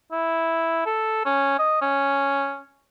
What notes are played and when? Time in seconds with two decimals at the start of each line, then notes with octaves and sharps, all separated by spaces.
0.12 E4
0.86 A4
1.25 C#4
1.59 D#5
1.82 C#4